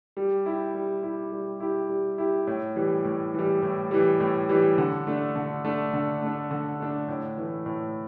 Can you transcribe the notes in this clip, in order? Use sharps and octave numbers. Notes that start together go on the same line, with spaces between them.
G3
E4 G4
G3
E4 G4
G3
E4 G4
G3
E4 G4
A2
E3 G3
A2
E3 G3
A2
E3 G3
A2
E3 G3
D3
A3 D4
D3
A3 D4
D3
A3 D4
D3
A3 D4
A2
E3 A3
A2